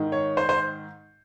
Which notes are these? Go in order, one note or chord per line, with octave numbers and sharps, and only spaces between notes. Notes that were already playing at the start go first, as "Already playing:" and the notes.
Already playing: G#2 D#3
C#5
C5
C5